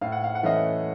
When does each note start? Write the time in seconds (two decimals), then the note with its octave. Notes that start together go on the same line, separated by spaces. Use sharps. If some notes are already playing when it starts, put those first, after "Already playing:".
0.01 A2 F5
0.12 F#5
0.24 F5
0.35 F#5
0.43 E3 A3 C#4 D#5 F5